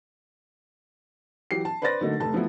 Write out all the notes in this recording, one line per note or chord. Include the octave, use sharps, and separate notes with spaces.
E3 F#3 G4 C7
A5
B4 C5 D5 C6 A6 A#6
D3 F#3 A3 A#3 D#4
F1 A3 A5
F3 F#3 A3 B3 E4